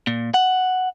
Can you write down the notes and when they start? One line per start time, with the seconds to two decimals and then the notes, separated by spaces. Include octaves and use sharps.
0.07 A#2
0.34 F#5